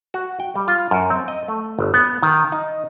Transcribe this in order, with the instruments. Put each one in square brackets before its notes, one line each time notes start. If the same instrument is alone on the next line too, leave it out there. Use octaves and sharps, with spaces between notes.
[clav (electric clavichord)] F#4
G5
G3
F4
F#2
C4
D#5
A3
G1
B3
D#3
D#4